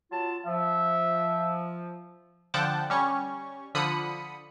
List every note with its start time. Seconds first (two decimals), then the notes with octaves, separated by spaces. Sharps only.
0.12 F#3 F4 A5
0.46 F3 E5
2.54 D3 F3 F#5 G5 A5 D6
2.90 G3 C#4 C#6
3.75 D3 F3 B5 D#6 C#7